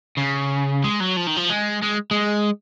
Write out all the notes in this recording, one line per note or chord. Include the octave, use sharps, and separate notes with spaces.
C#3
G#3
F#3
F3
D#3
F3
G#3
G#3
G#3